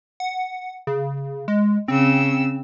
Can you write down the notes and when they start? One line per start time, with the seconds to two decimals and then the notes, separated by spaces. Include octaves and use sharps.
0.20 F#5
0.87 C#3
1.48 G#3
1.88 C#3 C4 E6